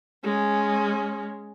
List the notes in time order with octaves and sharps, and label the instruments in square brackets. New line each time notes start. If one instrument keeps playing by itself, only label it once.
[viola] G#3 C#4